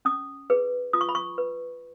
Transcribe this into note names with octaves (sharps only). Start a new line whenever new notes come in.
C#4 D#6
G#4 B4
F4 D#6
C#6
B5
C#6
B4